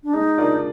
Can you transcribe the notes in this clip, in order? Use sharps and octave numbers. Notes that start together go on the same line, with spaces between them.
D4
G#3 D#4
D4 F4 A#4 D5